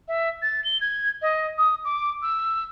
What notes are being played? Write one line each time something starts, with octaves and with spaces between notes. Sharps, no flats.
E5
A6
G7
G#6
D#5
D#6
D6
E6